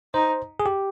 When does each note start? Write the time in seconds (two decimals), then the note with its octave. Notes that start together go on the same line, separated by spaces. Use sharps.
0.14 D#4 C5
0.60 G#4
0.66 G4